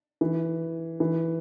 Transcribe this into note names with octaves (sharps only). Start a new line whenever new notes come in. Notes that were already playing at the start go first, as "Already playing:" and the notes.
E3
E3